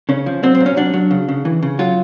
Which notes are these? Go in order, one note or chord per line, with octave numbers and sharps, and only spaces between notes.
C#3 C#4
F3
F#3 C4
C4
A#2
C#4
F#3 D4
F#3
C#3
C#3
E3
C#3
F#3 F4